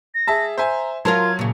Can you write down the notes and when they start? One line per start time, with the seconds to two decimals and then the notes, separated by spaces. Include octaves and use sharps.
0.15 A#6
0.27 G#4 E5 A5
0.58 C5 E5 G#5 A#5
1.05 F#3 F4 A#4 C5 A5 G#6
1.39 A#2 C#3